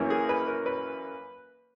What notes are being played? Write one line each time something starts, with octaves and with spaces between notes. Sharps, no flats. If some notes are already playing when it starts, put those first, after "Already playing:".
Already playing: F#2 E3 A#3 C#4
G#4
B4
A#4
B4